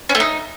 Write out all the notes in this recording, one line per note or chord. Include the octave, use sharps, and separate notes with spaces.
C#4
A3
D#4